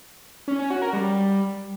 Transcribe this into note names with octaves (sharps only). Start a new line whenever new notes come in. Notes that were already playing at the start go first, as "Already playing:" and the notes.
C#4
C#4
F#4
A#4
G3